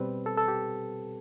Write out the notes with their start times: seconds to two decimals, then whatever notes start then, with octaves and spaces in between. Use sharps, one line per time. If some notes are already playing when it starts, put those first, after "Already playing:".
Already playing: B2 G3 C4 B4
0.26 A4
0.37 A4
0.48 G4